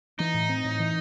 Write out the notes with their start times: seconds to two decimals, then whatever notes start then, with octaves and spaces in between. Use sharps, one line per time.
0.19 E3 D#4
0.34 A2
0.49 C4
0.64 A2
0.79 E3